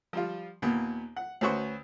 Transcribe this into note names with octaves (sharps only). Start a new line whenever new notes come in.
F3 G3 F4
D#2 A#2 B3
F#5
D2 C#4 F#4 B4 C5 C#6